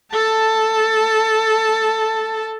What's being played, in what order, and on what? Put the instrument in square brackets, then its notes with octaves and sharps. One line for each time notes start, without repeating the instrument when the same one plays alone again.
[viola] A4 A5